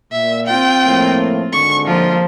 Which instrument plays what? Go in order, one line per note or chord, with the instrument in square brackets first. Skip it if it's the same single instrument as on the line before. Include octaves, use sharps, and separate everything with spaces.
[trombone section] A#2 [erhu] E5
[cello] C4 F4 [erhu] G5
[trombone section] A2 F3 A#3
[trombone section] G#1 D3 G#3 [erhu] C#6
[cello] F3 A#3 [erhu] F4